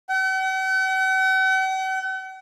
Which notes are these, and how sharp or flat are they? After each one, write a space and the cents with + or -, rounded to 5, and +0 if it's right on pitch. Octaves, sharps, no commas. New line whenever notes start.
F#5 +45